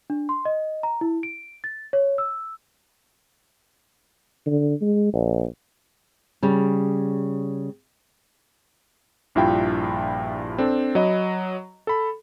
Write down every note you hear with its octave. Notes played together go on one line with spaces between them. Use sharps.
D4
C6
D#5
A#5
E4
D7
A6
C#5
E6
D3
G#3
A#1
C#3 G3
A#1 G2 E4 F4 G5
C4 D4 A4
F#3 D#5 B5
A4 B5